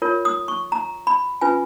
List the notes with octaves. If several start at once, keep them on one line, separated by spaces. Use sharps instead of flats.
F4 A#4 C#5
D#6
C#6
A#5
B5
C#4 F4 B4 G#5